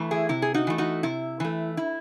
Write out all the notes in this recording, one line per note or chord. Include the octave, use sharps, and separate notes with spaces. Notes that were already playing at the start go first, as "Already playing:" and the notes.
Already playing: E3 A3
E4 G#4
C3 E4
G#4
D#4 F#4
E3 A3
D#4 F#4
C3 E4
E3 A3
E4